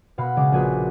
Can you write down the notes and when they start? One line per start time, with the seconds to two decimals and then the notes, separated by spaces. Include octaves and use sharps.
0.18 B2 F5 F#5 B5
0.36 C#3 G#3 D6
0.52 A#1 F#4 G#4 B4 B6